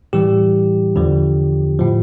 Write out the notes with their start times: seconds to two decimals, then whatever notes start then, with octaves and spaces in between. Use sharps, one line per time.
0.13 A2 E3 G3 G4
0.96 E2 D3 F3
1.79 A2 F3